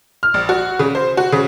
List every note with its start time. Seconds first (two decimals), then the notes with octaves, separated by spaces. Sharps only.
0.23 F6
0.34 A#1
0.49 F#4
0.79 C#3
0.95 C5
1.17 F#4
1.32 C#3